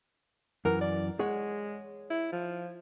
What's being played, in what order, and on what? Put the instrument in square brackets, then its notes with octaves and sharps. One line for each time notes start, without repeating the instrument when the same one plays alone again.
[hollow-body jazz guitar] F#2 E3 [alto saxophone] A#4
[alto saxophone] D5
[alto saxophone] G#3 [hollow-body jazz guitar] G#4 C#5 F#5
[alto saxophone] E4
F3